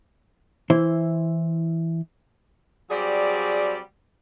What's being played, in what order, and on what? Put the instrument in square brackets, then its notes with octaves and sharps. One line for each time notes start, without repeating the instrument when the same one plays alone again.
[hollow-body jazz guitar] E3 E4 C5
[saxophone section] F#3 G3 C4 G#4 D5